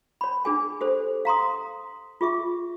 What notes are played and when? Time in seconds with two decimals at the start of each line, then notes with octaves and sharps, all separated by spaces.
0.21 C#5 B5
0.45 D4 G#4 G#5
0.81 G4 A4 C5
1.25 F5 A#5 C6 D#6
2.21 F4 G#4 E5 C#6